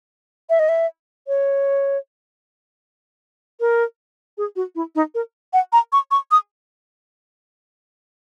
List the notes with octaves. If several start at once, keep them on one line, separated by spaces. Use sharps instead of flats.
E5
D#5
E5
C#5
A#4
G#4
F#4
E4
D#4
A#4
F#5
A#5
C#6
C#6
D#6